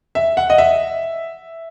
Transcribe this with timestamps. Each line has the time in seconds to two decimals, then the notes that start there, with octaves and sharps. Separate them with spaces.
0.15 E5
0.37 F#5
0.50 D#5
0.58 E5